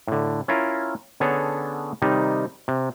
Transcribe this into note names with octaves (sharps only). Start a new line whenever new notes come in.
A2 D3
C#4 E4 F4 A#4
D3 B3 C#4 G#4 A4 C#5
C3 D#3 G3 D#4
C3